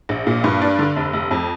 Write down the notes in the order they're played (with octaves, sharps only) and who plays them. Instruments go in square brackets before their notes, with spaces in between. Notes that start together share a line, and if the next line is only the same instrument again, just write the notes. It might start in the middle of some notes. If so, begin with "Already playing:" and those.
[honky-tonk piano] A#1
A#2
G2
D4
D3
F1
F1
F2